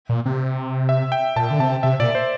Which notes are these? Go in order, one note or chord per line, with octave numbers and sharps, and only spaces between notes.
A#2
C3
E5
G5
A#2 A5
D3
C3 A5
C3 E5
A#2 D5
C5